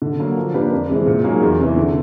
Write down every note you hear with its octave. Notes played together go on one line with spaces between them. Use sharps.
D3
F#3 A#3
F3
A#3 D4 G4 B4
F2
C3 E3 G#3 C4
A#2
F#3 A#3 D#4 G#4
E2
C3 E3
D3